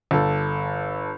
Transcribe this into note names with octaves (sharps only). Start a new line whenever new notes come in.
G1 A4